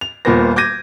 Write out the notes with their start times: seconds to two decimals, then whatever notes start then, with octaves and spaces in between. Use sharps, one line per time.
0.01 F7
0.25 D#1 A#2 B3 A#4 C5 A#6
0.56 D6 G6 G#6 A#6 D#7